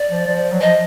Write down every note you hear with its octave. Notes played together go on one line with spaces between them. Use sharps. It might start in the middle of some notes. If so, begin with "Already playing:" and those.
Already playing: D5
F3
F3
F#3
F3 D#5